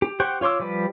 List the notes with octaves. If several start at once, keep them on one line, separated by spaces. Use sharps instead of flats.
G4
G4 C5 F#5 G5 C#6
F4 C#5 C6 D6 E6
F3 G3 G4 B4